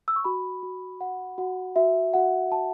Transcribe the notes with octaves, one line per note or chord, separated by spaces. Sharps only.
E6
C#6
F#4 B5
F#4
F#4 F#5
F#4 F#5
F#4 E5
F#4 F#5
F#4 A5